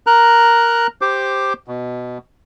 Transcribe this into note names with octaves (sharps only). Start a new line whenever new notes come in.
A#4 A#5 F#6
G4 C5 D6
B2